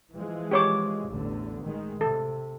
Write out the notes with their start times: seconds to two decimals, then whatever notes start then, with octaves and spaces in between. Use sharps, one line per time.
0.12 E3 F3 G#3
0.51 G4 C#5 D6
1.09 A1 E2 D3
1.63 D#3 G#3
2.01 C3 A4